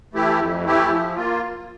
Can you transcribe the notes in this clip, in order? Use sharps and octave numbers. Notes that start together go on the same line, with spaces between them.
E3 A3 E4 G4
F2
E3 A3 E4 G4
F3
A#3 F4